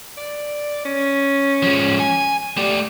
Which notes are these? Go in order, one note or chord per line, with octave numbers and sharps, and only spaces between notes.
D5
C#4
F3 G#3
G#5
A3 G4 D5